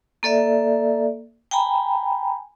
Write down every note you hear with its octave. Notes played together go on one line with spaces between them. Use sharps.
A#3 A4 D5 E5
G5 G#5 A#5 B5